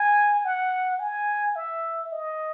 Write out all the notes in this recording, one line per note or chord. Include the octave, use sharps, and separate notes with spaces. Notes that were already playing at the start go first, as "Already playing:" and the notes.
Already playing: G#5
F#5
G#5
E5
D#5